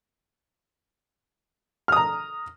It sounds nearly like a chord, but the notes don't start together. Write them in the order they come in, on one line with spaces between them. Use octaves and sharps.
F6 D#6 A#5